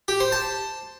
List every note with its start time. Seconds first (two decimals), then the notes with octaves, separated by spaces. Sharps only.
0.08 G4
0.20 C5
0.32 A5